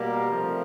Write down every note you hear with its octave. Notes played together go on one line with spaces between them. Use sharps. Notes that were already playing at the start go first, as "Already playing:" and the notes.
Already playing: B2 G3 A#3 A#4
C3 F3 A3